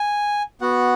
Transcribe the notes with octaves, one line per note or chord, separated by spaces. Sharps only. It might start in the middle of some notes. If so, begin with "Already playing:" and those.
Already playing: G#5
B3 F#4 F#5